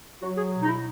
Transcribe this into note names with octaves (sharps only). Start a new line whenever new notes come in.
F#3 F#4
G#4
B2
D#4
E4